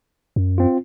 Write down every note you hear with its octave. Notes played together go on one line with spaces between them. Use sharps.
F#2
C4 F4